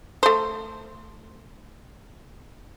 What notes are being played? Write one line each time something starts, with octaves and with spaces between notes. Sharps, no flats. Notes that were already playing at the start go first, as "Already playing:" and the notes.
A3 C5